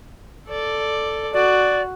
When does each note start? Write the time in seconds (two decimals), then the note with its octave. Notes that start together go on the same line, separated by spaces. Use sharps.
0.48 A4 D5
1.33 F#4 D5